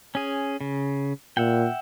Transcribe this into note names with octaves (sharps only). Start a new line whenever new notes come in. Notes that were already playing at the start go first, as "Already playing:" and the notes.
C#4 G#4
C#3
A#2 E5 F#5 G5